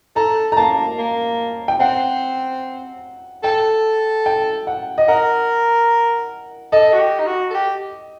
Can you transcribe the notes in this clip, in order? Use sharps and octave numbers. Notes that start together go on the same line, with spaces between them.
A4 A#5
A#5
A#3 A5
A#3
G5
C4 F#5
A4 G5
G5
F#5
D#5
A#4 F#5
A4 D#5
F#4
G4
D#4
F#4
A4
G4